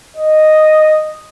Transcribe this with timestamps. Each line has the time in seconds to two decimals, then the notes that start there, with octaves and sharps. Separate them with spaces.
0.16 D#5